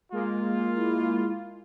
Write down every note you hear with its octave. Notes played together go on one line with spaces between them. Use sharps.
G#3 A#3 F4
E4